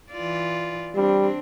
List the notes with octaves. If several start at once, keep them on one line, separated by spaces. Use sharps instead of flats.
E3 F4 D5
G3 C4 D4